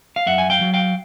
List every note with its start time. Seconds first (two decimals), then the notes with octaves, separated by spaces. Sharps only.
0.16 F5
0.26 F#2 E5 F#5
0.38 G#5
0.50 F5 G5
0.61 F#3
0.74 F5 G5